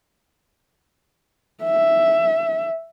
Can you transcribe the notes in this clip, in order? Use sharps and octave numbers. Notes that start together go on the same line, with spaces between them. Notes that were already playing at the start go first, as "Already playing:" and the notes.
E5